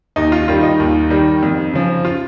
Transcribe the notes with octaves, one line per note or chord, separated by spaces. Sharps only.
D#2 D#4
F4
D#3 G3 F4
D#4
D#2
D#3 G3
F2
C#3 F3
F4